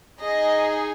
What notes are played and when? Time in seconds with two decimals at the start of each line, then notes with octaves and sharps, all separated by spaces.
0.20 D#4 G#4 D#5